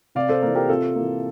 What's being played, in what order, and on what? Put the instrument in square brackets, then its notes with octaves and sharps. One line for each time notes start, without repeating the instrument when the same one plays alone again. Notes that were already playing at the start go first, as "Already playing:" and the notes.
[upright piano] C3 D5 F5
A4 C5
E3 A#3 A#4 D5
G4 A#4
C3 F4 A4
E3 A#3